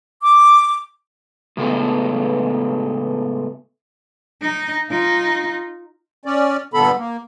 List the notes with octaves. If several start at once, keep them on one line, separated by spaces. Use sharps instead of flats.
D6
A2 C#3 G#3 A3 B3
D#4
D#4 F4
C#4 D5
G2 A#2 D3 B3 A4 B5
A#3